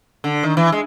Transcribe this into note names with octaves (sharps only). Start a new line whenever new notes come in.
D3
D#3
E3
G#3